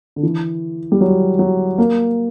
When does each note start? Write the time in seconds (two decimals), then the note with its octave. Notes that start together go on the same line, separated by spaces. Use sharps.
0.16 D3
0.23 E3
0.92 G3
1.01 F#3
1.39 F#3
1.78 A#3